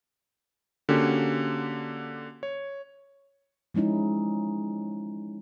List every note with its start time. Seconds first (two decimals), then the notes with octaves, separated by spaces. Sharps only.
0.89 D3 A#3 C#4 F#4 G4
2.43 C#5
3.74 F3 G#3 C#4 D#4 E4